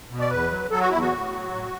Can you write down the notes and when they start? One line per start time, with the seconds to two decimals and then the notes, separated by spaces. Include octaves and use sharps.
0.10 B2
0.19 D5
0.30 E2 B4
0.51 F#3
0.70 F#3 A4
0.80 F#4
0.90 E2 E4
1.01 F#4
1.12 A2
1.31 F#3
1.51 A2